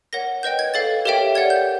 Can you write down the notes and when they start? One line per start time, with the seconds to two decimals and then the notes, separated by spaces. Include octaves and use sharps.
0.13 A#4 C#5 F#5 A#6
0.43 B4 D#5 G5 G6
0.59 G#6
0.74 A4 C#5 F5 A6
1.05 G4 A#4 C#5 E5 G5
1.35 A#4 D5 F#5 G#6
1.50 G6